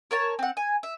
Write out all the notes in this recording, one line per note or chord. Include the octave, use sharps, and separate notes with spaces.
A#4 C#5 A5
C4 F#5
G#5
E5